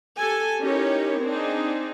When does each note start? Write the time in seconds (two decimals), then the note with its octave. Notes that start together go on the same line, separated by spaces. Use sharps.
0.17 G4 A4 G#5
0.62 C#4 D#4 E4 G4 A#4 C#5
1.22 C4 D4 D#4 G#4